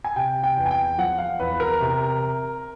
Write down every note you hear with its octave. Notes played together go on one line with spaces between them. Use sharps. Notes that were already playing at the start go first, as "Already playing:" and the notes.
G#5
C3 G5
G5
E2
G#5
G5
F3 F#5
F5
E2 B4
A#4
C3